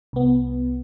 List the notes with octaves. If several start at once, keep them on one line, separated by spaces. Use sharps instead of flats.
C2 B3